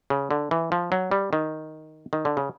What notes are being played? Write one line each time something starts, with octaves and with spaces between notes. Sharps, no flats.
C#3
D3
E3
F3
F#3
G3
D#3
D#3
D3
C#3